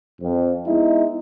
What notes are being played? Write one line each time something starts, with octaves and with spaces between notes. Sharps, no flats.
F2
G#3 B3 D#4 E4